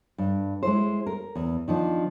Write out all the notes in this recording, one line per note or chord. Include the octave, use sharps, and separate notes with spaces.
G2
G#3 E4 C5
A#4
E2
D#3 F3 D4